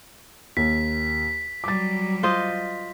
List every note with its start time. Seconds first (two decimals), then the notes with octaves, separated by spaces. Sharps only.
0.57 D#2 B6
1.64 F#3 G3 D6 A6
2.23 F4 C5 D#5